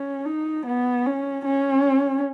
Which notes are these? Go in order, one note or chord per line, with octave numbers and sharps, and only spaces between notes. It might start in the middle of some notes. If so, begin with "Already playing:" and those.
Already playing: C#4
D#4
B3
C#4
C#4